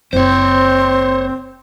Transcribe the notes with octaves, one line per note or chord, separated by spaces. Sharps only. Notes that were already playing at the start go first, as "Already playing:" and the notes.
F#1 C4 E4 C5 C#5